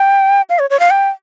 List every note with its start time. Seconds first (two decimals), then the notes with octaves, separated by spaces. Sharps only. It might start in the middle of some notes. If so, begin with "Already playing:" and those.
Already playing: G5
0.50 F5
0.59 C#5
0.70 C#5
0.80 F5
0.90 G5